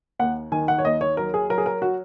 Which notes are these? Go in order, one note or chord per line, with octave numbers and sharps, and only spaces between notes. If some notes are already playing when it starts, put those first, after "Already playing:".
D#2 F#5
D#3 G#5
F#5
C#5
D#2 D#5
C#5
F#3 A#4
G#4
F#3 A#4
G#4
A#4
F#4